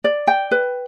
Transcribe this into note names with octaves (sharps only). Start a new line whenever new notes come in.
D5
G5
B4